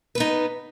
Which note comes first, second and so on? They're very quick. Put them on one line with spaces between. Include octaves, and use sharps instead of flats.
B4 B3 D#4